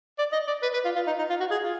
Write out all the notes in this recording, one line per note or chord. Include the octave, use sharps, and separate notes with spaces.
D5
D#5
D5
B4
B4
F4
F4
D#4
D#4
F4
F#4
G#4
F4